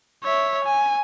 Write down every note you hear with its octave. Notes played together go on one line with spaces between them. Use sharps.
C#5 E5
G#5